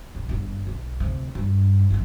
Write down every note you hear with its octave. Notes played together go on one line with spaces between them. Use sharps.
A#1
G1 G2
B1
D2 C3
G2
G#1 F3